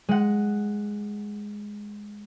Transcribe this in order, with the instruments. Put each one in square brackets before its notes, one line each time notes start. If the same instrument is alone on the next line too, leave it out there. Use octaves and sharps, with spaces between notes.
[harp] G#3 F#5